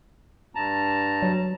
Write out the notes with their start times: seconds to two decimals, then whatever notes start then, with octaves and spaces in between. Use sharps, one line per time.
0.55 G2 A5 A#5
1.22 F#3